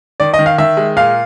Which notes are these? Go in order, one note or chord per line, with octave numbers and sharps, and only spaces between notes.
D#3 D5
D#5
D#3
F5
D#3 E5
G#3
A#2 F5